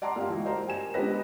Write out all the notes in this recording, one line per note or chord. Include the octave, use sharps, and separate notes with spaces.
D5 F#5 A5 A#5 C6 D6
A#3 G4 F5
E3 G#3 F#4
A#4 C5 D5 A#5
G4 G#5 E7
G#3 B3 D4 G4 B4 A#6